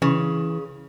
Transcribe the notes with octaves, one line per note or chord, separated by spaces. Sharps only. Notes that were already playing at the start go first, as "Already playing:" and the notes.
C#3 E3